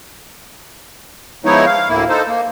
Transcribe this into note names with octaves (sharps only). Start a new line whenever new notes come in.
F3 G#3 B3 D#4 E4 C#5
F5
D2 A2 A#3 E4
D#4 A4 C5
A#3